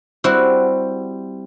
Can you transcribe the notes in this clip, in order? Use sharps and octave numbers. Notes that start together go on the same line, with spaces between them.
G3 C4 E4 F#4